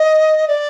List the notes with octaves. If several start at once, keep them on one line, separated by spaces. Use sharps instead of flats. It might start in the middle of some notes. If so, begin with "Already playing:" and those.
Already playing: D#5
D5